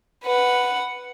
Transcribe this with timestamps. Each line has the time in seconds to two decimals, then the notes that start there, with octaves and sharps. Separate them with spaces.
0.24 B4 F#5